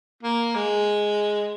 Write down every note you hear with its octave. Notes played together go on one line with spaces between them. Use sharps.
A#3
G#3